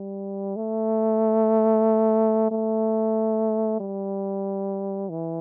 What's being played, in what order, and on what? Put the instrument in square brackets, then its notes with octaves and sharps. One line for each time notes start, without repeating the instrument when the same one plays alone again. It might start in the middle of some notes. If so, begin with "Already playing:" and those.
Already playing: [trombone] G3
A3
A3
G3
E3